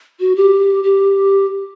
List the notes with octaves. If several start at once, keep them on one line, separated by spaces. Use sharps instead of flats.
F#4
G4
G4